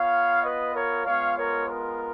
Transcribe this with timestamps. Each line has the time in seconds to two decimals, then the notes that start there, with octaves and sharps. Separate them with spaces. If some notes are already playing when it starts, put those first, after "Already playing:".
Already playing: B3 F4 C#5 F5
0.43 B4 D#5
0.74 A#4 C#5
1.05 G#3 B3 F4 C#5 F5
1.37 A#4 C#5
1.68 A#4